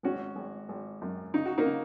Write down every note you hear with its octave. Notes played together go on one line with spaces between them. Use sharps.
G#1 C#4 F#4
G#1
G#1
F#2
C#3 D#4
F#4
A#3 D#4
C#3